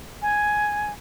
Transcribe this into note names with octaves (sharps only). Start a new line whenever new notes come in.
G#5